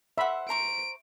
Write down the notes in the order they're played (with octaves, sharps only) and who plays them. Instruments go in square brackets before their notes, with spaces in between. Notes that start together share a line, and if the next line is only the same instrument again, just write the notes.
[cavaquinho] C5 F#5 [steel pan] E5 B5
[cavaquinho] C5 A#5 C#6 [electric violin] D7